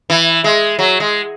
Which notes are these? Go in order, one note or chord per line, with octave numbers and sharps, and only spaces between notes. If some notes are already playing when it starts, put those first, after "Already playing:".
E3
G#3
F#3
G#3